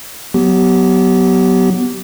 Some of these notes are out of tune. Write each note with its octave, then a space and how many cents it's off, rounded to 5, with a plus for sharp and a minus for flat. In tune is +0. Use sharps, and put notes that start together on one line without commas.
F#3 +0 B3 +0 G4 -25